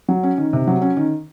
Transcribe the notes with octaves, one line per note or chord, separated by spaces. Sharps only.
F#3
C#4
D#3
C3
F#3
C#4
D#3